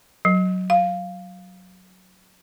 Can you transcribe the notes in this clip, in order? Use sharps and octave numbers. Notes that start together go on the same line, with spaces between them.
F#3
F5